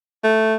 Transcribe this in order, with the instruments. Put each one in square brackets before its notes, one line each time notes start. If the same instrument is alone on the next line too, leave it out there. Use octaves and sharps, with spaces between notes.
[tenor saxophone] A3